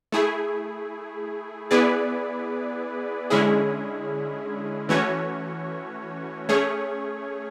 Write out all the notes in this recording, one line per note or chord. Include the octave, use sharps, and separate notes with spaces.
A3 E4 G#4
B3 E4 G#4 B4 D5
D3 G#3 C#4 E4 G#4
E3 A3 C#4 F#4 C#5
A3 C#4 G#4 C#5